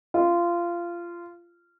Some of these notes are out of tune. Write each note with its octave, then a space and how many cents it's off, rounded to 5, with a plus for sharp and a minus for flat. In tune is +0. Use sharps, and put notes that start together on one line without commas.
F4 -20